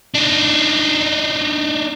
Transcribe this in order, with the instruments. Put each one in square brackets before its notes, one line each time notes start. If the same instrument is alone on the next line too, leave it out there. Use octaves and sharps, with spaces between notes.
[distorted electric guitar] D4 D#4